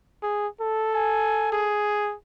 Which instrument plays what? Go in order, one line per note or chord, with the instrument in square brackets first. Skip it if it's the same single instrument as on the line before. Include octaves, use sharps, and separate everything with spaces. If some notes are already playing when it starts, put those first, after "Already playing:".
[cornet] G#4
A4
[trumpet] G#5
G#4